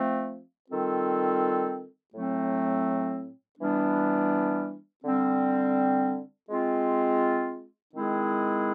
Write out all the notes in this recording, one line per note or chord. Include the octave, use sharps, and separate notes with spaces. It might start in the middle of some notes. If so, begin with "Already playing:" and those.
Already playing: F3 A3 C4
D#3 G3 C4 F4 A4
A2 F#3 A3 C4
E3 G3 B3 D4
D3 G3 C4
G#3 C4 F4
D#3 G#3 C4 E4 G#4